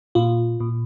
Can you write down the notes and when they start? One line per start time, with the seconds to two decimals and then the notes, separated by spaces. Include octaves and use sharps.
0.15 A#2 F4
0.60 A#2